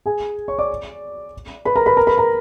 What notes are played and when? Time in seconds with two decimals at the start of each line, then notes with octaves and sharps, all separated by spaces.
0.06 G#4 G#5
0.48 C#5 C#6
0.59 D5 D6
1.65 B4 B5
1.76 A#4 A#5
1.86 B4 B5
1.97 A#4 A#5
2.07 B4 B5
2.18 A#4 A#5